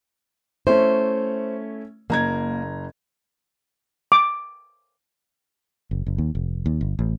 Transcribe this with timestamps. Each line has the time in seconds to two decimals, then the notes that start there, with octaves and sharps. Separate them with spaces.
0.67 A3 C#4 E4 C5
2.10 F#1 A#3 A#5 G#6
4.12 D6
5.91 F#1
6.06 F#1
6.18 D#2
6.35 F1
6.66 D#2
6.81 G1
6.99 A1